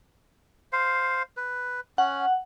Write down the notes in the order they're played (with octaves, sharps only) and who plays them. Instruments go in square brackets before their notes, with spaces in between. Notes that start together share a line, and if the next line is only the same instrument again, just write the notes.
[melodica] C5 F5
B4
[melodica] C#4 [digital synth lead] F#5